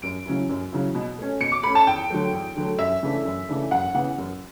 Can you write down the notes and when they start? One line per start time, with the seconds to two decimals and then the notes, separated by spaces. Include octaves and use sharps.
0.02 F#2 D7
0.26 C#3 F#3 C#4 E4
0.49 F#2
0.72 C#3 F#3 C#4 E4
0.95 B2
1.18 A3 C#4
1.40 B2 C#7
1.52 D6
1.63 A3 C#4 B5
1.75 A5
1.87 E2 G5
2.10 D3 F#3 A3
2.33 E2
2.56 D3 F#3 A3
2.79 F#2 E5
3.03 C#3 E3 A3 D4
3.25 F#2
3.49 C#3 E3 A3 D4
3.71 F#2 F#5
3.94 C#3 E3 B3 F#5
4.18 F#2